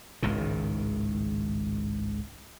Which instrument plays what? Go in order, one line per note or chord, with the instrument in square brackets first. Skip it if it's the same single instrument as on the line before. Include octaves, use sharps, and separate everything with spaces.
[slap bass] G#1 C#2 A2 D#3